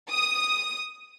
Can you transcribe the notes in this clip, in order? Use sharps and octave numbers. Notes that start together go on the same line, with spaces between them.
D#6